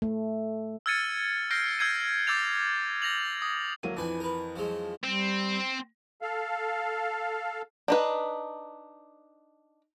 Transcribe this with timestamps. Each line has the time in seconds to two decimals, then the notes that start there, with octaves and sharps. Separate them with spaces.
0.02 A3
0.86 E6 F6 G#6 A6 C#7 D#7
1.51 F6 G6 A#6 C7 D7
1.79 E6 G6 G#6 C7 D#7
2.27 D6 E6 G6 A6 F7
3.02 G#6 A#6 F7 F#7
3.42 D#6
3.83 D2 F#3 A#3 D#7
3.97 F2 E3 D4 B4 G#5
4.20 A#4 B4
4.56 F3 F#3 G#3
5.04 G3 C4
6.22 A4 F5
7.88 D4 D#4 B4